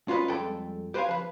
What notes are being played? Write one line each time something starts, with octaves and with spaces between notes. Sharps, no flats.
C#4 F4 F#4 A#4 B4 D#5
F2 G3 G#3 A4 G5
G4 B4 C5 D5 F5 G#5
F3 B4